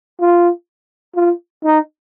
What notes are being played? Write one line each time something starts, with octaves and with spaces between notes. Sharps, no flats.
F4
F4
D#4